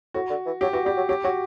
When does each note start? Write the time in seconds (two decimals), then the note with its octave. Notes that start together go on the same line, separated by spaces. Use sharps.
0.14 A2 F#4
0.30 D3
0.46 E3
0.61 F#3 G4
0.73 E3 F#4
0.85 G3 G4
0.97 F#3
1.09 F#3 G4
1.24 F#3 F#4